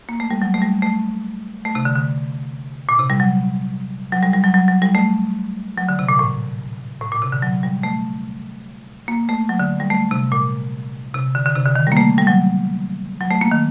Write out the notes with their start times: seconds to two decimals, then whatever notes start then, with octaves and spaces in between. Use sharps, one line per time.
0.09 A#3
0.20 A3
0.30 G3
0.42 F#3
0.54 A3
0.62 G3
0.82 A3
1.65 A3
1.75 C3
1.85 D3
1.96 D3
2.89 A#2
2.99 C3
3.10 G3
3.20 F#3
4.12 F#3
4.23 G3
4.33 G3
4.44 F#3
4.54 F#3
4.68 F#3
4.82 G3
4.95 A3
5.78 F#3
5.89 D3
5.99 C3
6.09 A#2
6.19 A2
7.01 A2
7.12 A#2
7.22 C3
7.32 D3
7.42 F#3
7.63 G3
7.83 A3
9.08 A#3
9.29 A3
9.49 F#3
9.59 D3
9.80 G3
9.90 A3
10.11 C3
10.32 A#2
11.14 C3
11.35 D3
11.46 D3
11.56 C3
11.66 D3
11.75 D#3
11.87 G3 A#3
11.97 A3
12.18 G3
12.27 F#3
13.21 F#3
13.31 A3
13.41 A#3
13.51 D#3